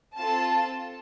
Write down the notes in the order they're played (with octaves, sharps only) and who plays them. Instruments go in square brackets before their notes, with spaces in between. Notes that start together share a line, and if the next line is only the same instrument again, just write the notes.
[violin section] C4 F4 A4 A5